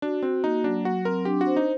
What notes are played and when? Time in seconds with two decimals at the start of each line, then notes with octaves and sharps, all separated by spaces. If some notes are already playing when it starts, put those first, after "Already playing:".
0.02 D4 F#4
0.23 C4 F#4
0.44 A#3 D#4
0.64 F#3 D4
0.85 F#3 F#4
1.05 C4 A#4
1.25 D4 G4
1.41 F#4
1.47 C5
1.56 D#4